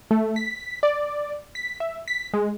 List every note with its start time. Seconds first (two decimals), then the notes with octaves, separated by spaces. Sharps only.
0.11 A3
0.36 B6
0.83 D5
1.55 B6
1.80 E5
2.08 B6
2.33 G#3